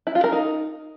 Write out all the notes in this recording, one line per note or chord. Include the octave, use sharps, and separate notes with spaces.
E4
F4
A#4
D#4